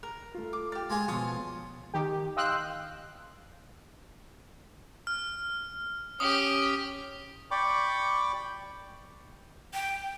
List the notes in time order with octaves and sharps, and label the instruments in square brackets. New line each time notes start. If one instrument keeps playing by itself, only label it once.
[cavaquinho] A#4
[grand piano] A3 F4
[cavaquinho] D6
[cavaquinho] G4 D5 [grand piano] F6 A6
[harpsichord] G#3 F4 G#4
[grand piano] B2 F3 [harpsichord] F4 [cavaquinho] C#5 A5 D#6
[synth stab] D#3 G4
D#5 F5 G5 C6 E6 F#6
[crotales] F6
[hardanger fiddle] C#4 G4 [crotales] D#6
[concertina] D5 G5 B5 C#6 D6
[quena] G5